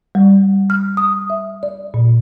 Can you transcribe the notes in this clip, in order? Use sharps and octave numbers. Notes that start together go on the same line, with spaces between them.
G3
F6
D#6
E5
D5
A#2